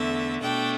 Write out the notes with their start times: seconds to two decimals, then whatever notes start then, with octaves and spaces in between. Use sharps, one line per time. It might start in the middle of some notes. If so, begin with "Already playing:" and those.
Already playing: E2 D3 A3 E5
0.40 B2 A3 D4 G5